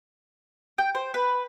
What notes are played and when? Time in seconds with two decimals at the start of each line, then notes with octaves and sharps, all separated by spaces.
0.78 G5
0.95 C5
1.14 B4